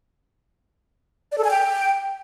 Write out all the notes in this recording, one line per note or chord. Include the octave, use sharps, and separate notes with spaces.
D5
A4
G#5
G5